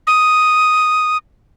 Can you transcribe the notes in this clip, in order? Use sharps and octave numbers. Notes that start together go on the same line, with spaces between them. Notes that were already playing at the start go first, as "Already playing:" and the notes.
D#6